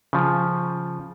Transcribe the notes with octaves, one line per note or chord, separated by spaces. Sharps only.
C#3 F3